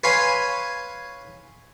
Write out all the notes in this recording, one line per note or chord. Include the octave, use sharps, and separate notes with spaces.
B4 C#5 F5 G#5 B5 C6